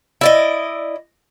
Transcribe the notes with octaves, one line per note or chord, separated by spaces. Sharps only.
E4 D5 D#5